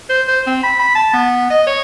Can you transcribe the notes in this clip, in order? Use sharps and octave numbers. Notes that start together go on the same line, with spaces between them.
C5
C5
C4
B5
B5
A5
B3
D#5
C#5